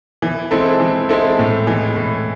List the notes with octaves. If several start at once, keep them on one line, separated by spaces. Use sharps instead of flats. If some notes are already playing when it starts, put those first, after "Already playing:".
E3
G#3 C4 E4 A4
E3
G#3 C4 E4 A4
A2
E3 G#3
A2